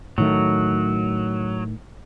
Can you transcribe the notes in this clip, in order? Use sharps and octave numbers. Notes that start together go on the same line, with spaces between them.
A2 D#3 F#3 A3